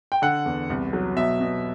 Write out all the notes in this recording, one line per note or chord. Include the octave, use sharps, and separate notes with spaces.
G5
D3 F#5
E2
C2
F#3
B2 E5
B2